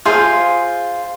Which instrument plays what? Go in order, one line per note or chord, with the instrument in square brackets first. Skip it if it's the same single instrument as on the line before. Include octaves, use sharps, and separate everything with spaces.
[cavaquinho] F4 G#4 C5 F5